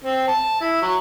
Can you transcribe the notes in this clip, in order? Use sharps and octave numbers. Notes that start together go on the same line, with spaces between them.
C4
A5
E4
F#3